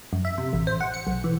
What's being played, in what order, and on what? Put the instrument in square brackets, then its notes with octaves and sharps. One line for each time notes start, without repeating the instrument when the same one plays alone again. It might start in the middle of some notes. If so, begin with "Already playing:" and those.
[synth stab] F#2
E5
C3
A1
C5
F#5
C#7
B1
E3